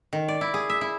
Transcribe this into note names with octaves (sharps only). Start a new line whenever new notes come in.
D#3
D5
E4
G#4
E5
E4